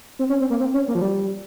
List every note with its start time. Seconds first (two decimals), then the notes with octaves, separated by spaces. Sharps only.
0.19 C4
0.30 C#4
0.40 C4
0.50 A#3
0.60 C4
0.74 C#4
0.88 A#3
0.95 F3
1.02 G3